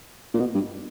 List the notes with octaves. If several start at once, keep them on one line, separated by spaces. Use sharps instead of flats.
A#2
B2
G2